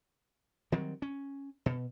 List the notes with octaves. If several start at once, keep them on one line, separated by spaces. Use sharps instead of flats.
D#3 F#3 G3 C4
C#4
B2